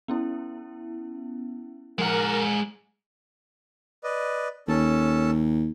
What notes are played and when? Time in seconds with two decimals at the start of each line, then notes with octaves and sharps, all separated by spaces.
0.08 B3 C#4 E4
1.99 F3 G#3 A#4 F#5
4.04 B4 D5 D#5
4.68 D#2 C#4 A4 A5